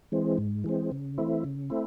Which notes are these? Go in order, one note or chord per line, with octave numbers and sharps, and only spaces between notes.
E3 G#3 C4
G#2
E3 G#3 C4
C#3
E3 A3 C4 E4
C#3
A3 C4 E4